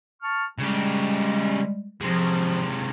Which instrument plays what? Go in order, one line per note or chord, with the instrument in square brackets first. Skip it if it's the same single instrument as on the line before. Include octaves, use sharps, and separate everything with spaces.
[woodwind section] A5 C#6 F6
[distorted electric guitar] C#3 G4 [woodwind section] G3 G#3
[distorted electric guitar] C3 G#3 [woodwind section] F3